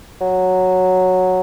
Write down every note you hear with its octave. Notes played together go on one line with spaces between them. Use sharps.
F#3